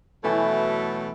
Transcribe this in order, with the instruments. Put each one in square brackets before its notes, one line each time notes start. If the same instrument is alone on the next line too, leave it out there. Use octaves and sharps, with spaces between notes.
[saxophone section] B2 F#3 A3 [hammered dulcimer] E3